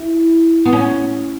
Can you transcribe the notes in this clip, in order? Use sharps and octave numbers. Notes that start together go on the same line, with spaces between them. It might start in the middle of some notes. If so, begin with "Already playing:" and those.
Already playing: E4
B3
C#4